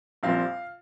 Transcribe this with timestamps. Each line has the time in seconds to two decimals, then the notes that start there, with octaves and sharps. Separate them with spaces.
0.23 A#1 A#2 G3 C4 F5